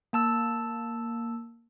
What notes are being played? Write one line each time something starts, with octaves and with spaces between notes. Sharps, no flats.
A#3 A5 E6